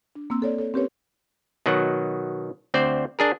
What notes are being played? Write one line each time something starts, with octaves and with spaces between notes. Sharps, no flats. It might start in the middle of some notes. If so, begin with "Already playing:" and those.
D4
A#3 C4 E6
A4 C#5 D5
A4 C#5
C4 C#4 G4 A#4 B4 C#5
B2 D#3 F#3 F#5
D2 C4 C5 D5
D4 G#4 A#4